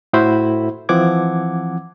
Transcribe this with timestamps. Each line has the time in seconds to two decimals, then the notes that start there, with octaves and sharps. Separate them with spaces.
0.13 A2 E4 F#4 C5 E5 B5
0.89 E3 F3 C4 F#5 D6 G#6